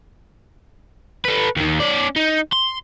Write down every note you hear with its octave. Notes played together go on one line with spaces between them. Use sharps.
A4 B4
D#2 D#3
C#4 D5
D#4
C6